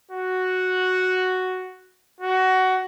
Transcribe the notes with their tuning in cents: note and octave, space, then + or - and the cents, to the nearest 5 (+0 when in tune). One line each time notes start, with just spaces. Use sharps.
F#4 +0
F#4 +15